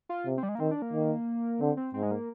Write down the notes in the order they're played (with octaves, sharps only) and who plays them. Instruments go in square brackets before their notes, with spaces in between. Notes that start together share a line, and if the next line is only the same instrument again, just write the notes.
[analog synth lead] F4
[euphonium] C3
[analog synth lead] C4
G3
G#3
A#3
[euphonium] D#3 [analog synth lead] C4
[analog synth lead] D4
A#3
[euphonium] D#3
[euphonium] D3 [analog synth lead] C4
[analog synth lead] C4
[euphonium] G#2 [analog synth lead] C4
[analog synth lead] G#3
A#3